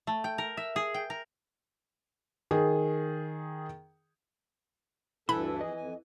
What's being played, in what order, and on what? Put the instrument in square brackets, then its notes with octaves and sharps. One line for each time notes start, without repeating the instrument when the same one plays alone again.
[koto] A3
G5
A#4
E5
G#4
G5
A#4
[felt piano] D#3 G#4
[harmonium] D2 G2 A4 [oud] E3 [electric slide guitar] E4 [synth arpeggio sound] B5
[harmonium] F2 G#4 [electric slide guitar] D#5
[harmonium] F2 G#5